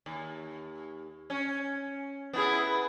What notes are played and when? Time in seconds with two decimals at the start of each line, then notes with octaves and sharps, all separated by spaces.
0.06 D#2
1.30 C#4
2.33 B3 E4 G#4